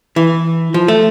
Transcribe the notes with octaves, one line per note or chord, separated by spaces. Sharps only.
E3
F3
A3